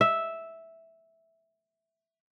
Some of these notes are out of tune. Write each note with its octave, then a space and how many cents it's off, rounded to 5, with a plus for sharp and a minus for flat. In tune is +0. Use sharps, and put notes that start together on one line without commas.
E5 -5